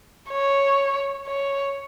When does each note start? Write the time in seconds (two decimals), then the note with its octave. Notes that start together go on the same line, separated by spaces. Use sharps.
0.30 C#5
1.27 C#5